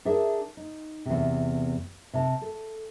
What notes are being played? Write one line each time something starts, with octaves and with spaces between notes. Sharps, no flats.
D4 G#4 A#4 E5
D#4
E2 C3
C3 A5
A4